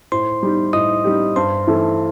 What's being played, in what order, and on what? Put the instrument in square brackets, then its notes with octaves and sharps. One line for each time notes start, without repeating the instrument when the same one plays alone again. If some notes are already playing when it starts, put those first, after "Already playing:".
[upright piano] A2 [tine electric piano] C5 C6
[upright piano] G3 D#4 G4
[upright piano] A2 [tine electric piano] D#5 D#6
[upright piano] G3 D#4 G4
[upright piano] G2 [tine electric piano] C5 C6
[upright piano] E3 A3 E4 A4